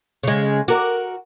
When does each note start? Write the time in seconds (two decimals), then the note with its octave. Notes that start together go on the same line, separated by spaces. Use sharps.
0.23 C#3 G#3
0.68 F#4 A#4 D5